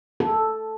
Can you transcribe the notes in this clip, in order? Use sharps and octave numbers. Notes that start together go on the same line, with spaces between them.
A4